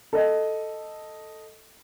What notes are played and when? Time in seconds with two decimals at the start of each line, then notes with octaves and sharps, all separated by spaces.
0.13 A4 D#5